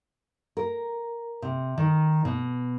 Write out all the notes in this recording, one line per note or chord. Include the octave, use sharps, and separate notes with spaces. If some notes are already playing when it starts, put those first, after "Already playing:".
A#4
C3
D#3
B2